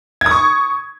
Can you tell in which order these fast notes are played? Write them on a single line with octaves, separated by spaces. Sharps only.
G#6 D#6 C#6